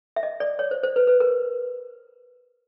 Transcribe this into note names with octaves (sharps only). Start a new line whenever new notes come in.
E5
D#5
D5
C#5
C5
C5
B4
B4
A#4